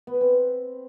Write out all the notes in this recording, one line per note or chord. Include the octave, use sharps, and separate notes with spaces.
B3
B4
C4